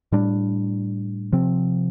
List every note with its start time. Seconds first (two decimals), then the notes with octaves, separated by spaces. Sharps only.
0.12 A2 G3 D4
1.32 C3 F3 C4